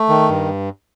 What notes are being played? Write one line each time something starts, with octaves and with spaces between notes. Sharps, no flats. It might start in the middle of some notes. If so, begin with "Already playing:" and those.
Already playing: A3
D#3
G2